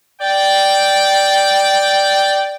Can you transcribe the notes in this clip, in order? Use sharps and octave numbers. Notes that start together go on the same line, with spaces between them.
D5 G5